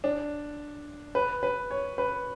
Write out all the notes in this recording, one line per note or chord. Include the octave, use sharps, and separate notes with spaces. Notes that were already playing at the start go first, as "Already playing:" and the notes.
D4
B4
B4
C#5
B4